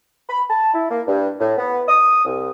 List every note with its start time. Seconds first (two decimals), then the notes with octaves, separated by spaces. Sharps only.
0.30 B5
0.50 A5
0.74 E4
0.91 A#3
1.08 G2
1.40 A2
1.58 B3
1.88 D#6
2.25 C2